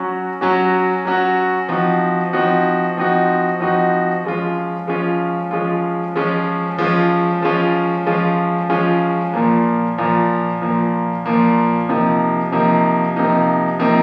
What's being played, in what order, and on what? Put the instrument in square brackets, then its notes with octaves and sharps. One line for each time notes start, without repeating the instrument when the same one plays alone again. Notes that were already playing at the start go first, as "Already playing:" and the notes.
Already playing: [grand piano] F#3 C#4 F#4
F#3 C#4 F#4
F#3 C#4 F#4
F3 C4 D#4 F#4
F3 C4 D#4 F#4
F3 C4 D#4 F#4
F3 C4 D#4 F#4
F3 G#3 C#4 F4
F3 G#3 C#4 F4
F3 G#3 C#4 F4
F3 G#3 C#4 F4
F3 G#3 C#4 F4
F3 G#3 C#4 F4
F3 G#3 C#4 F4
F3 G#3 C#4 F4
A#2 F3 A#3
A#2 F3 A#3
A#2 F3 A#3
A#2 F3 A#3
C3 F3 A#3 D#4
C3 F3 A#3 D#4
C3 F3 A#3 D#4
C3 F3 A#3 D#4